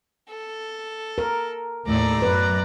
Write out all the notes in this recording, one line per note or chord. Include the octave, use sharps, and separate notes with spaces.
A4
A#4
D#2 A2 A3 D5 A#5
F#2 B4